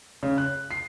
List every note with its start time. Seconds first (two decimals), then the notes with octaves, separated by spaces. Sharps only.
0.23 C#3
0.38 F#6
0.71 C7